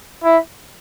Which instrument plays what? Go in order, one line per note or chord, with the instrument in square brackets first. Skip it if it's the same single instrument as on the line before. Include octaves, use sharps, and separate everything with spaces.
[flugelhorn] E4